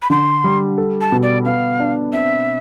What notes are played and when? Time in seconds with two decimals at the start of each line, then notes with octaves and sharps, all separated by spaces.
0.02 B5
0.10 D3 C6
0.44 G3
0.78 A4
1.01 A5
1.12 B2
1.23 D5
1.45 B3 F5
1.80 D4
2.13 C4 E5